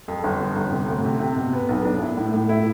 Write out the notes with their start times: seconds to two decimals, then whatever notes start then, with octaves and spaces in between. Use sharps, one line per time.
0.08 F2
0.24 G1
0.40 F2
0.56 G1
0.72 C3
0.88 D2
1.05 C3
1.20 C3
1.36 B2
1.53 B3
1.69 B1
1.85 D4
2.02 E4
2.17 A2
2.34 A2
2.49 E4